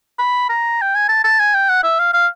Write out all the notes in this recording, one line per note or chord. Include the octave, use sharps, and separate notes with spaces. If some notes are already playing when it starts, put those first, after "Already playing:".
B5
A#5
G5
G#5
A5
A5
G#5
G5
F#5
E5
F5
F5